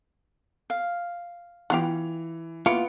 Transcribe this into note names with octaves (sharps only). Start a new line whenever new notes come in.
F5
E3 B3 F4 G4 F7
A#3 B3 E4 F4 C#7 D7